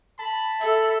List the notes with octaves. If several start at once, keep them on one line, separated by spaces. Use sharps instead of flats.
A5 B5
A4 E5